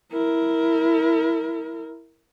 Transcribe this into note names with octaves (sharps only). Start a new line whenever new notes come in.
E4 A#4